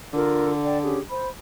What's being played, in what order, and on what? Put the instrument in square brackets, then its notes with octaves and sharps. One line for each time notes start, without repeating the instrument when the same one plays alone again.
[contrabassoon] D3 [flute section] F4 A4 A#4
[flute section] D5 G5 A5
C#4 G4 G#4
C5 B5